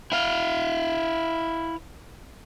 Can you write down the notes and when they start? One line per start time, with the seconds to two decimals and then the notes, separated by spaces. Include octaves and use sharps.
0.12 E4 F5